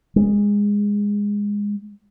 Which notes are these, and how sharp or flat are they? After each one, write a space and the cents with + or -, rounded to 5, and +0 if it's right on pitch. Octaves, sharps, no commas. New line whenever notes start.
G#3 -20